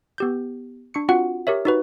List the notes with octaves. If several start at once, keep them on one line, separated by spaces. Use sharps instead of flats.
B3 G4 G6
D4 C#6 C#7
C4 F4 F#4 F#5
G4 A#4 C#5 E5
D#4 F#4 B4